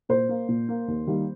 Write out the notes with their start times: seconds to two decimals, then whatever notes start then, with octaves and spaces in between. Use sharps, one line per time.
0.09 A#2 C5
0.29 A#3
0.48 A#2
0.68 A#3
0.88 D#2
1.07 D#3 G3 A#3